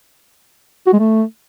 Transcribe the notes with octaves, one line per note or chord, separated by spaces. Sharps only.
F#4
G#3
A3